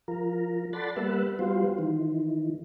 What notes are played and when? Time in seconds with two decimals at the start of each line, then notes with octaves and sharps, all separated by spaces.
0.08 F3 A#4
0.73 A4 D5 F#5 B5 C6 A6
0.96 G3 A#3 B3 B4 E5 F#5
1.39 F#3 G3 B3 F4 C5
1.79 D#3 E3